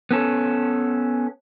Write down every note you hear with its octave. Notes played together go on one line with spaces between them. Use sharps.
B3 C#4 A4